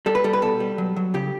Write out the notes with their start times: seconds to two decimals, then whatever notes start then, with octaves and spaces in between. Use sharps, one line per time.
0.06 G3 A4
0.15 B4
0.24 G3 A4
0.33 B4
0.42 B2 A4
0.60 G3
0.78 F#3
0.96 F#3
1.14 C#3 G4